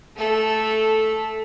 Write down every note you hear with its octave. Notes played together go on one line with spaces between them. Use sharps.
A3 A4